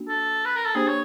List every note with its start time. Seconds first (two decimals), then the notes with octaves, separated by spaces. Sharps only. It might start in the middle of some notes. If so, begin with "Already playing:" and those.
Already playing: A#3 D4 F#4
0.08 A4
0.45 B4
0.56 A#4
0.66 A4
0.75 A#3 D4 G4 G#4 C5
0.88 C#5